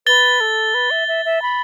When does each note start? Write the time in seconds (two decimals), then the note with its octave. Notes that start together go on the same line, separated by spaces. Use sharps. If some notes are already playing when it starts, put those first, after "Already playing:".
0.07 B4 A6 G7
0.40 A4
0.74 B4
0.91 E5
1.08 E5
1.25 E5
1.42 B5